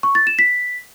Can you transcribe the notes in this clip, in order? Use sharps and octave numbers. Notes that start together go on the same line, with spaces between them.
C#6
A6
E7
B6